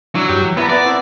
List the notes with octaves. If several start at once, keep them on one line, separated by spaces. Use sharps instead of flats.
F#3 D4 E4
G2 G4
E3
B3 E4 A#4 D5 A5
B3 D5 F#5
C4 E4